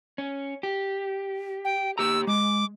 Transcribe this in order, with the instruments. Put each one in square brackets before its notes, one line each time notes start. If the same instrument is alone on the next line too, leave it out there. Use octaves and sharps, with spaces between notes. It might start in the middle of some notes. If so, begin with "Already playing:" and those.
[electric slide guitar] C#4
G4
[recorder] G5
[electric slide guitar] A#3 G4 A#5 [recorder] E6
[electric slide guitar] G#3 [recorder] D6